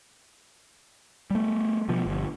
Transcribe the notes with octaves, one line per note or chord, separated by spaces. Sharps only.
G3 A3
B2 F3
G1